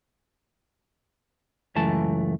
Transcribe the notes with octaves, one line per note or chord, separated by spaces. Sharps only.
C#2 F#2 E3 A3 A5